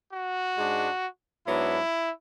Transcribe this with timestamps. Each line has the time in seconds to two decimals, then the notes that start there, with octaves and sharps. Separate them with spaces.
0.11 F#4
0.57 G#2 G#3 D4
1.47 G#2 F#3 B3 D4 E4